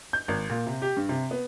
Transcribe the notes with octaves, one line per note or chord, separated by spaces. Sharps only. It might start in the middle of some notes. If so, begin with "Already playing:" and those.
G6
G#1
A#2
C3
G4
G2
C3
B3